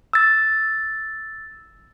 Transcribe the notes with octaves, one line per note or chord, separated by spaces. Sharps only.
E6 A6